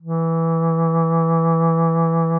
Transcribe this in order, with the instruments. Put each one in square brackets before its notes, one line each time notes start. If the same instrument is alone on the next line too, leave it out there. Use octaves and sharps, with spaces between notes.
[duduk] E3